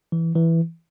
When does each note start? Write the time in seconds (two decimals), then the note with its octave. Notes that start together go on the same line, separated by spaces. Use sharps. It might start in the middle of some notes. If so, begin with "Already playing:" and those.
0.12 E3
0.36 E3